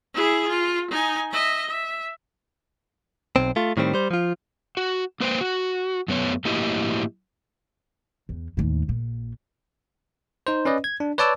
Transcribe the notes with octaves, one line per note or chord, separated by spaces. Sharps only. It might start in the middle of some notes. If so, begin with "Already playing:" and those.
E4 G#4
F4
D#4 G#5
D#5 E5
E5
B1 C4
A3 F4
A2 D#3 G3 C4
G3 C5
F3 F4
F#4
A#3 B4 C5 G5
F#4
F#2 A3 B3 C#5
A2 F#3 A#3 E4 G4 D#5
E2
D#2 A2
A#1 A#2
D#4 C5
C#4 B4 D5 D#5
G#6
D4
B4 C#5 D5 A5 D6 E6